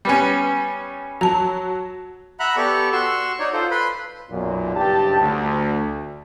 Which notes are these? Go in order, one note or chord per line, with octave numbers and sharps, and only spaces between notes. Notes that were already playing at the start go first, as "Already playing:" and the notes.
G3 B3 C#4
F#3 A5 A#5
E5 F#5 A#5 B5 F#6
B3 G4 A4 D5 C#6
F#4 C6 C#6 E6
D#4 C#5 D5
F4 A4 C5
B4 B5 C6
B1 F#2 A#2
F#1 G2 G4 A5
D2